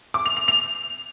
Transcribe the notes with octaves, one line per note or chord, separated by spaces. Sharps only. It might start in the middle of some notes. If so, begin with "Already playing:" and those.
D6
F7
F7
F7